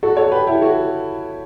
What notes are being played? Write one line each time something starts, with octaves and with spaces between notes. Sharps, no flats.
F#4 A4
A4 C#5
G4 B4
E4 G4
F#4 A4